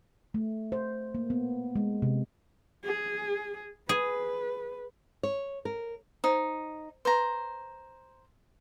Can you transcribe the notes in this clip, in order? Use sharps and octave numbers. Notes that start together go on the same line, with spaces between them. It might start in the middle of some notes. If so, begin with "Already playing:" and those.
A3
C5
A#3
B3
G#3
C3
G#4
G#4 B4
C#5
A#4
D#4 C5
B4 C5 A#5